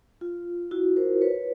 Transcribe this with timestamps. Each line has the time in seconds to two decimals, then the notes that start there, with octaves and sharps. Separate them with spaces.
0.21 F4
0.71 E4 F#4
0.96 A#4 C5
1.21 B4 C#5